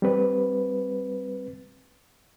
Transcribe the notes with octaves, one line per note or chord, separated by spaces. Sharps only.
G3 C4 B4